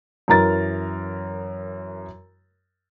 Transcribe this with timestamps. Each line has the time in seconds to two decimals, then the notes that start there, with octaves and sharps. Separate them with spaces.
0.28 F#2 E3 A#4 A#5 A6